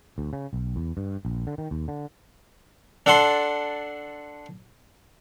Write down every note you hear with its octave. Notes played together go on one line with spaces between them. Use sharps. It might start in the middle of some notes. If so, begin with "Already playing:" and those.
D2
C#3
B1
E2
G2
A#1
D3
D#3
D#2
D3
D4 A4 F#5 A5 C6